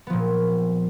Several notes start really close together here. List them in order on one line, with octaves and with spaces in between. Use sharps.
B3 F3 A#2